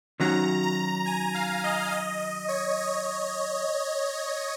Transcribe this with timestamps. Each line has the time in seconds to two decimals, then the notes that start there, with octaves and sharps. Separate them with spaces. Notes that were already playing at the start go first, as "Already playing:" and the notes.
0.20 D#3 F#3 C#4 F#4 A#5
0.63 A#5
1.06 G#5
1.35 F5
1.63 D#5
1.92 D#5
2.20 D#5
2.48 C#5
2.78 D#5